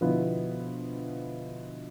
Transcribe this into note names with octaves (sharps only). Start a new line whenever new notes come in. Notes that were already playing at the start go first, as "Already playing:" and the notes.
B2 D3 F3 B3 E4 B4